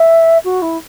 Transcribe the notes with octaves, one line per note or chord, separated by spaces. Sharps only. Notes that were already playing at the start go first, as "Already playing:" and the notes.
Already playing: E5
F#4
E4